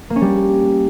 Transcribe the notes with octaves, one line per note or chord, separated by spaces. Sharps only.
A#3
C#4
G3